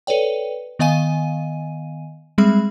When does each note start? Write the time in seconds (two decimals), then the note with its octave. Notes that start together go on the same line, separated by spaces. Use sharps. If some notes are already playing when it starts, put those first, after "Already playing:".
0.07 A4 B4 C#5 D5 G5
0.79 D#3 B3 D#5 F5 G#5 D#7
2.38 G3 G#3 C4 G#4 E5 B5